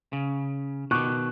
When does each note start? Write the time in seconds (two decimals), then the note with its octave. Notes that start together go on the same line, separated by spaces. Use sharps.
0.13 C#3
0.91 B2 D#3 C#6 D6 F#6